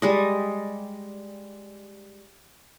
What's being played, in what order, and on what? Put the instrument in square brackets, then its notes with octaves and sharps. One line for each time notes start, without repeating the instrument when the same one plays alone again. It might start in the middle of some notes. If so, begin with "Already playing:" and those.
[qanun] G3 G#3 D#5